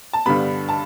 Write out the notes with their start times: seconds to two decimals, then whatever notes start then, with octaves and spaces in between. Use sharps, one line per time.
0.13 A5
0.26 G2 D3 G3 B3 B5
0.69 A5